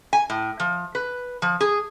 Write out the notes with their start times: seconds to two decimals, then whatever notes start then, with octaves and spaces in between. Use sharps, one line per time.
0.13 G#5
0.30 A2
0.60 F3
0.95 B4
1.42 F3
1.61 G#4